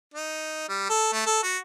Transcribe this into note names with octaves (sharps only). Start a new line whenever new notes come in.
D#4
G3
A4
A3
A4
F#4